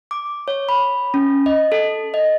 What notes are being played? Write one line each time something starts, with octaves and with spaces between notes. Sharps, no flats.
D6
C#5
B5
C#4
D#5
A4
D#5